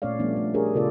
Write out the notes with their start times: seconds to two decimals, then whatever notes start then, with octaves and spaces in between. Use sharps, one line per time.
0.02 A#2 A3 C#4 C#5 D5 F5
0.19 F3 G3 A3 B3 D4
0.36 A3
0.54 D4 G4 G#4 A#4 C#5
0.73 A#2 C#3 B3 F4 A4 D5